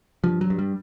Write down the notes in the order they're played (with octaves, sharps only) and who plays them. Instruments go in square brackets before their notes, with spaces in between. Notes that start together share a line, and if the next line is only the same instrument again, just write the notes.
[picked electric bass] G2 F3
F#3
G2
G3